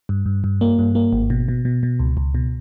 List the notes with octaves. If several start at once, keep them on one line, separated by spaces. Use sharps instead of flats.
G2
G2
G2
A#3
G2
A#3
G#1
B2
B2
B2
B2
C#2
C#2
B2